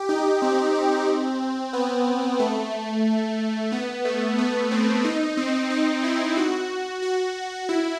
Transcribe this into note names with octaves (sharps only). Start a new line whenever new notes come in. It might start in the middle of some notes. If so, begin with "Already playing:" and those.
Already playing: G4
D#4
C4
B3
A3
B3
A3
B3
C4
D#4
C4
D#4
E4
F#4
F#4
E4